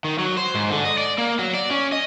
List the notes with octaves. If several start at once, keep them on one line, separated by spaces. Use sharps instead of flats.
D#3
F#3
C5
G#2
D3
D#5
D5
A#3
F#3
D5
C#4
D#5